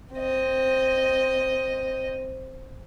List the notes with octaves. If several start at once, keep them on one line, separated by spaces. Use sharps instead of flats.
C4 D#5